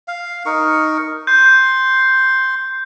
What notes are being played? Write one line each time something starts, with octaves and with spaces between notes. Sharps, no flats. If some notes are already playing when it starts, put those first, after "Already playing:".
F5
D#4 A#4 C#6
C6 G6